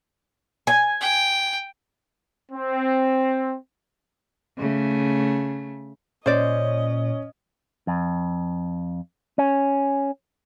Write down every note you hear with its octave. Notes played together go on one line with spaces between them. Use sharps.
G#5
G5
C4
C#3 A3
A#2 C#4 C5 D5 D#5
F2
C#4